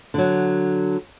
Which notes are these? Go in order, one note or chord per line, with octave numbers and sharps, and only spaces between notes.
D3 F#3